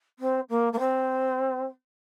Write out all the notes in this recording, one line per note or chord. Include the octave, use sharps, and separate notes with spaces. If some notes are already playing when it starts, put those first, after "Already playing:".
C4
A#3
A#3
C4